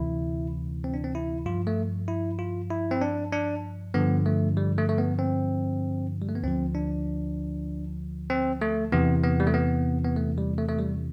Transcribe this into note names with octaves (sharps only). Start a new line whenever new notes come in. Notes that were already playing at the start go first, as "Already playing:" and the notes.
Already playing: D2 C3 E3 E4
C4
D4
C4
E4
G2 F3 F4
A3
E4
F4
E4
C4
D4
D4
G2 D3 F3 B3
A3
G3
A3
A3
B3
C4
G3
A3
B3
D2 D3 F3 C4
D4
C4
A3
E2 C3 E3 B3
B3
G3
A3
B3
B3
A3
G3
A3
A3
G3